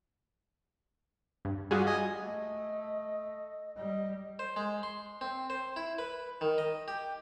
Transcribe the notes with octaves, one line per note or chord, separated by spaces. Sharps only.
G2
G3 F4 F#4 G#4
D#5 G#5
A3 D#5
G3 D#5
C5
G#3
C6
C4
C5
E4
B4
D#3
D#5
G4